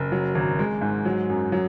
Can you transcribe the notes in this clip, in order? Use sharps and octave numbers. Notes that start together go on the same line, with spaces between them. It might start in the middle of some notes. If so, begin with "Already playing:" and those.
Already playing: F#1
F#3
G#1
G#3
G#2
F#3
F#2
F#3